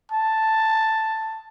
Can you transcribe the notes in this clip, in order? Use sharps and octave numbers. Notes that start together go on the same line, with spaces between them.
A5